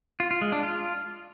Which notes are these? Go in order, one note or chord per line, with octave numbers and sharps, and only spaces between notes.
F4
F4
G#3
D4
F4